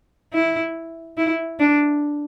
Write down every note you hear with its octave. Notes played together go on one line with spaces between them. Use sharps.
E4
E4
D4